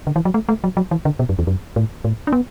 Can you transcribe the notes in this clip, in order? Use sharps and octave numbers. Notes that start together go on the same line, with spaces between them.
D3
E3
F#3
A3
A3
F#3
F#3
E3
D3
B2
F#2
E2
F#2
A2
A2
D4
B3